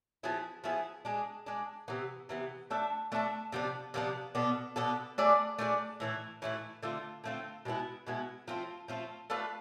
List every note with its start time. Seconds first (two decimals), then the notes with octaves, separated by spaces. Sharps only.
0.23 F3 B3 E4 G#4
0.64 F3 B3 E4 G#4
1.05 G#3 D4 G#4
1.46 G#3 D4 G#4
1.88 C3 E3 B3
2.29 C3 E3 B3
2.70 A3 D4 A4 E5
3.12 A3 D4 A4 E5
3.52 C3 F3 B3 D4
3.94 C3 F3 B3 D4
4.35 B2 B3 D4 A4
4.76 B2 B3 D4 A4
5.18 A3 D4 G#4 D5
5.59 A3 D4 G#4 D5
6.00 A2 E3 A3 E4
6.42 A2 E3 A3 E4
6.83 D3 A3 C4 F4
7.24 D3 A3 C4 F4
7.65 B2 G#3 B3 E4
8.07 B2 G#3 B3 E4
8.48 F3 A3 C4 F4
8.88 F3 A3 C4 F4
9.30 A3 D4 F4 B4